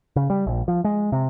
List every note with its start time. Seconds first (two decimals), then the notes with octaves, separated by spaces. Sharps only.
0.16 C#3
0.30 G3
0.47 A#1
0.68 F3
0.84 G#3
1.12 C3